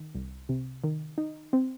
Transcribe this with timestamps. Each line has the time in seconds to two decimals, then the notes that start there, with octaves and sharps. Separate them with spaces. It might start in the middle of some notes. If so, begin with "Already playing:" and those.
Already playing: D#3
0.15 C2
0.49 C3
0.84 D#3
1.18 D#4
1.53 C4